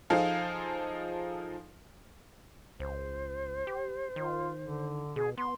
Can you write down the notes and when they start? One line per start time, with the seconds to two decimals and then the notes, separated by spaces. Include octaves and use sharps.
0.10 F3 D#4 F4 G#4 A4 F5
2.80 C#2 C5
3.67 G4
4.16 D#3 F4
4.64 D3
5.16 B2 G#4
5.38 B3 C6